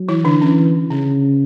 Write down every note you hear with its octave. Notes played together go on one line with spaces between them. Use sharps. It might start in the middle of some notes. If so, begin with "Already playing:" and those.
Already playing: F#3
E3 E4
D3 D4
E3 C#4
C#3 C#4